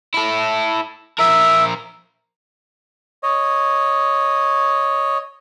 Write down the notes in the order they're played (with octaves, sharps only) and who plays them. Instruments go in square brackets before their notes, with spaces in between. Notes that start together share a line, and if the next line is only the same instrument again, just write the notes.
[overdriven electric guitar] E4 A4
[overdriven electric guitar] F3 A#4 [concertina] E5
[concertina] C#5 D#5